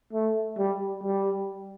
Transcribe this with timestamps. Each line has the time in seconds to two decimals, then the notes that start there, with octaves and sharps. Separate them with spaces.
0.13 A3
0.58 G3
1.04 G3